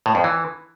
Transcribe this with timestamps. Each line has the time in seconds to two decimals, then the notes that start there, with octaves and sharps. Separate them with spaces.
0.06 A2
0.15 F2
0.24 E3